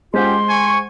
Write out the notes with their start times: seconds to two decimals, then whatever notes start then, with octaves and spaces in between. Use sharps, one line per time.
0.14 G#3 C#4 F4 G4 C5 F#5 C6
0.49 G#5 C#6